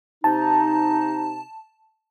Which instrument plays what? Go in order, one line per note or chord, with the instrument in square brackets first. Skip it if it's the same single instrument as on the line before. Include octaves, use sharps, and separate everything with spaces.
[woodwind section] C3 D#4 [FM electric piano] A5